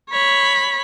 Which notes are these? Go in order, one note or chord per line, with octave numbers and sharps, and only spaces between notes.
C#5 B5